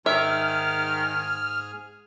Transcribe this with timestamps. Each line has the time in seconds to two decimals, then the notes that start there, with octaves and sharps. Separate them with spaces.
0.06 G#2 D#3 G#4 E5 G#5 F6